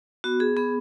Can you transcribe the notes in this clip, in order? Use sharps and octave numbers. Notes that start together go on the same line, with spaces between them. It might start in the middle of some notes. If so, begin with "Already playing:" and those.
B3 F#4
G#4
B3 G#4